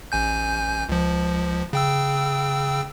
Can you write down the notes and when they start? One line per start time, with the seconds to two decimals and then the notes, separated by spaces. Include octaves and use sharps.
0.12 A1 G#5 G6
0.89 C#2 F3
1.73 C#3 G5 E6